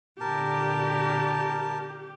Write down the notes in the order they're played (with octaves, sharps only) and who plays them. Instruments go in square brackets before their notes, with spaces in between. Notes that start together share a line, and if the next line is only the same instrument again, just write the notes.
[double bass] A#2 D3 [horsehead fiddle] G4 [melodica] A#4 A5